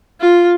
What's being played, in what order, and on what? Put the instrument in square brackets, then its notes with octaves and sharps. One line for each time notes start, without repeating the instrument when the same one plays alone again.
[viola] F4